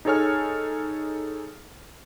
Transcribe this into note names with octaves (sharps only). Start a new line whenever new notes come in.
D#4 G#4 A4 C#5 G#5 F6